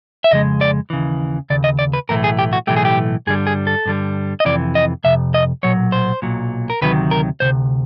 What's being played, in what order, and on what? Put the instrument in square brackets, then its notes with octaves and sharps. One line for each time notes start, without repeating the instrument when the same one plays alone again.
[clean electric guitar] E5
F2 C#3 G#3 D#5
D5
D#2 C#3 E3
D#2 C#3 D5
D#5
D5
B4
B1 A2 E3 A3 A#4
G#4
G4
F#4
B1 A2 E3 A3 G4
G#4
G4
G2 D3 G3 G#4
G#4
A4
G2 D3 G3
D#5
F2 C3 E3 D5
D#5
F2 C3 E5
D#5
B1 A#2 F#3 C#5
C5
B1 A#2 F#3
A#4
D2 C3 D#3 F#3 B4
A#4
D2 C3 C5